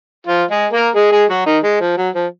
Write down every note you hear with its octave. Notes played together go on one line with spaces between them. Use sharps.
F3 F4
G#3 G#4
A#3 A#4
G#3 G#4
G#3 G#4
F#3 F#4
D#3 D#4
G#3
F3
F#3
F3